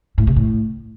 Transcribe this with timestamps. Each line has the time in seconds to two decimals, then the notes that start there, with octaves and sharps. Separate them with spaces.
0.18 A2
0.27 C3
0.36 A2